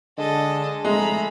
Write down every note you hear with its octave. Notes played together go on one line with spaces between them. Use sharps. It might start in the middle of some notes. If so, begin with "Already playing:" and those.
D3 G#3 A4 D#5
F1 G#3 A3 A#5 B5